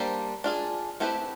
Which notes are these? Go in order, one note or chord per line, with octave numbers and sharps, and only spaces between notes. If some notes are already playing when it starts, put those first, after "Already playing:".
Already playing: G3 A#3 D4 G4 C5
D4 F4 G#4
A3 C4 E4 G4 B4